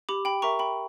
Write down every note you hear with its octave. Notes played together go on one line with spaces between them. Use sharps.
G4 B5 D6
G5 B5
A#4 E5 A#5 C#6
G5 B5